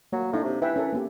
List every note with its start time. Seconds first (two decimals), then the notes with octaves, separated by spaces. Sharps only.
0.12 F#3 A#3
0.32 A2 D4 D#4 F5
0.44 C3
0.62 E3 B4 E5 G5
0.76 C#4 A4 A#4
0.93 A#3 B3 G4